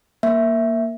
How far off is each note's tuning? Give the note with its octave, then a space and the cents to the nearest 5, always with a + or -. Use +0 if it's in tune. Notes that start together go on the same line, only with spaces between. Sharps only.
A#3 +5 E5 +0